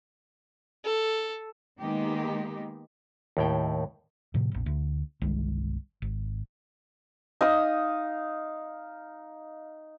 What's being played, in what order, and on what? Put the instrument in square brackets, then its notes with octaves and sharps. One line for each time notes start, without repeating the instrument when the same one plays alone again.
[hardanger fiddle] A4
[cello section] D#3 G#3 A#3 B3 D#4 G4
[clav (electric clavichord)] D#2 A2 G5
[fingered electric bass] A2 C3 F3
F1 A#1
D2
G1 C2 D#3 G#3
G#1
[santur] D#4 F5 D#6